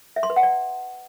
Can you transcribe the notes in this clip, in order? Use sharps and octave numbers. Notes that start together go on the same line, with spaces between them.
E5
C6
B4
F#5
D5